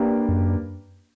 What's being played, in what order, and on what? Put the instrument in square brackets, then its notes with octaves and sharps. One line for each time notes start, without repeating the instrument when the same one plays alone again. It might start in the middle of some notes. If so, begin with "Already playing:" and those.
Already playing: [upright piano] A#3 D4 G4 B4
[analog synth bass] F#2